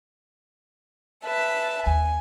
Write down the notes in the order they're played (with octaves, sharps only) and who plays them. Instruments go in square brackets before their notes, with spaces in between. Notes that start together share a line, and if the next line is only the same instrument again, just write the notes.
[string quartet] B4 E5 A5
[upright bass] D#2 [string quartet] G#5